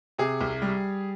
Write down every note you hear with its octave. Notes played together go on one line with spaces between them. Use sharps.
C3 G#4
C2
G3